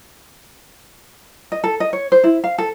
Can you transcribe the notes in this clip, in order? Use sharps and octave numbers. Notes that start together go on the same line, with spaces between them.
D#5
A4
D#5
C#5
C5
E4
F5
A4